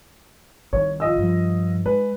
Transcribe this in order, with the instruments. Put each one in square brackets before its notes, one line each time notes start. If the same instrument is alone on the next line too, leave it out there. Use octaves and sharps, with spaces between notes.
[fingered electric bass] C2 D#3 [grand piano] C#5
[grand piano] F4 D#5 E6
[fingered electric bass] G2 F3
[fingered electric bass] G#3 [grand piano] B4